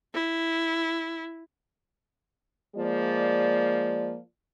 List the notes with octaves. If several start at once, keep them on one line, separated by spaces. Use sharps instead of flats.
E4
F3 G#3 A#3 D5